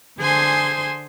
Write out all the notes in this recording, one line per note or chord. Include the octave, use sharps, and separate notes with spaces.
D3 G#4 C5 G#5 C6